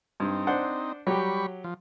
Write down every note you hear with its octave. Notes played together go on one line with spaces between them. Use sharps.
G2 C4 D#4
D4 C5 F#5
F#3 G3 G4 B5 C#6
F3